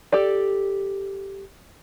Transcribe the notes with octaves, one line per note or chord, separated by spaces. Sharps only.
G4 A4 D5